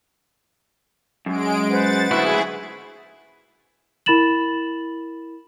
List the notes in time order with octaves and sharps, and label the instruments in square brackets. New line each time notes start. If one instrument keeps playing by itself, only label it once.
[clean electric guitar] F#2 [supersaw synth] G#3 D7
[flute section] B4 C5 F#5 [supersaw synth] A6
[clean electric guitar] D2 B3 F#4 [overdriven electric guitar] E4 [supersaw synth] G#4
[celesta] E4 A#4 B5 A6 E7 F#7